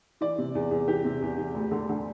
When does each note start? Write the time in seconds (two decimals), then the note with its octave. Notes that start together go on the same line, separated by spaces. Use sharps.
0.21 E3 D5
0.38 C3
0.55 E2
0.71 E2
0.88 E3 G4
1.05 C3
1.22 E2
1.38 E2
1.55 D2
1.71 D3
1.89 D3